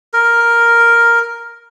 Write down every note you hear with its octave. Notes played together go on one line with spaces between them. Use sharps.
A#4